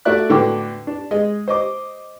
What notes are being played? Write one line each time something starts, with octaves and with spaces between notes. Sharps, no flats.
A3 F#4 D5 E5 F#6
A2 D3 B3 F#4 G5 D6
D4
G#3 D#5
C5 D#5 D6